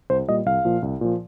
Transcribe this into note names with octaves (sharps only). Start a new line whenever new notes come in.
C2 C5
A#2 G3 D#5
C2 F5
A#2 F3
C2
A#2 F3